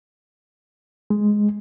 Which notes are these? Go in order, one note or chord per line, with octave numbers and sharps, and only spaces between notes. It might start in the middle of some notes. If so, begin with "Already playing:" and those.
G#3